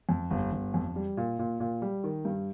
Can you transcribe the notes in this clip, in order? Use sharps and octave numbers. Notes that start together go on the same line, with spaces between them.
F2
G1
G1
F2
G3
A#2
A#2
A#2
G3
D#3
G2